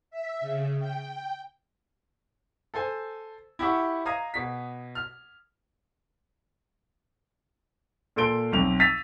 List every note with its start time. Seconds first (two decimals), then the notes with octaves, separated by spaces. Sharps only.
0.11 E5
0.41 C#3
0.79 G5
2.74 A4 C5 G#5
3.59 E4 G4 E5 F#5 C#6
4.05 D#5 F5 A#5 D#6 G#6 D#7
4.34 B2 B6
4.95 F6
8.16 A#2 A4 C6 D7 G7
8.52 B1 C4 F7
8.80 E6 A6 B6 D#7 F7